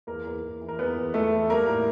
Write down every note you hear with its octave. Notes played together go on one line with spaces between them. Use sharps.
E2 A#3 A#4
E2
E2
E3
A#4
E2 B3 B4
E2
E2 A3 A4
E3
G3 A#3 A#4
A2